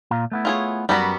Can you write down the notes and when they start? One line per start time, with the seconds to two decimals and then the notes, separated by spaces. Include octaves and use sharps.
0.11 A#2 F4 A#5
0.32 A3 B3 E4
0.45 F4 G#4 C#5
0.89 F#2 G3 B3 F#4 A#4